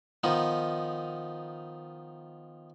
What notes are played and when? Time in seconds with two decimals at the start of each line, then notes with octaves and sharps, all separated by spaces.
0.24 D#3 F3 B3 D#4